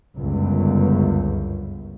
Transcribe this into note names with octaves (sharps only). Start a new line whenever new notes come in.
G1 C#2 F#2